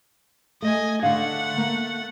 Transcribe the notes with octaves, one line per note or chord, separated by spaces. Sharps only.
A3 D#5 G#5
D3 A3 D4 F5 F#5
A#3